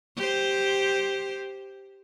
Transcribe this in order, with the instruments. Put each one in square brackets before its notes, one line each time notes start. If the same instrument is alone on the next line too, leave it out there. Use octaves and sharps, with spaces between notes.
[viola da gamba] G4 C5